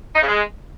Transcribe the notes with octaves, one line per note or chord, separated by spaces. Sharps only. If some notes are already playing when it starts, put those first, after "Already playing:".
D#4
C#3
G#3